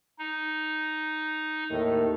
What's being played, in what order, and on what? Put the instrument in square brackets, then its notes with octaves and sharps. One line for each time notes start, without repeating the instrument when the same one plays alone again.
[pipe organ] D#4
[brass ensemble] D#2 A2 D#3